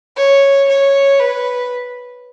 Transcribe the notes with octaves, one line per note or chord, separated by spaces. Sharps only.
C#5
C#5
B4